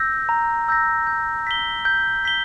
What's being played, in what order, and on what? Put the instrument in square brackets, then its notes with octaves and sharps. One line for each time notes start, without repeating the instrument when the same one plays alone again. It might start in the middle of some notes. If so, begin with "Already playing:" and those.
Already playing: [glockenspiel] E6 G6 A#6
A#5
E6 G6 A#6
G6
B6 G7
G6
B6 G7